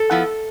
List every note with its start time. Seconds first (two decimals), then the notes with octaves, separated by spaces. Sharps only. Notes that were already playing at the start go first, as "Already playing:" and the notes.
Already playing: A4
0.11 F3 B3 E4